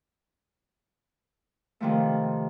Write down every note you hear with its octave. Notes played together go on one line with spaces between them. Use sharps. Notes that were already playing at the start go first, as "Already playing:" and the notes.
C3 D#3 F3 A3